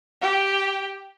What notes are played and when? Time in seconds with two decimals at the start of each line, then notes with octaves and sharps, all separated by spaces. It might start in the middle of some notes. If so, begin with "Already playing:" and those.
0.21 G4